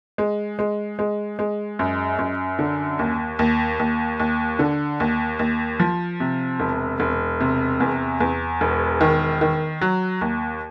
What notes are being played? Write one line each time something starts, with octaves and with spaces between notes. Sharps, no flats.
G#3
G#3
G#3
G#3
F#2
F#2
D3
D#2
D#2
D#2
D#2
D3
D#2
D#2
F3
C3
E1
E1
C3
E2
E2
E1
D#3
D#3
F#3
D#2